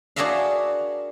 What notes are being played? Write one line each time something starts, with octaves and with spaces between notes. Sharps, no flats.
D4 F#4 G#4 A#4 E5 F5